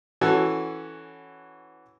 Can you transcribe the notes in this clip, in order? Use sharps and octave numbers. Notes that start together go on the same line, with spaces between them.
E3 C#4 F#4 A4